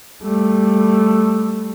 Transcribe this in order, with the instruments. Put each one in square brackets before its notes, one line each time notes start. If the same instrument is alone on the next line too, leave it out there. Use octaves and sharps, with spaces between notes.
[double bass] G3 A3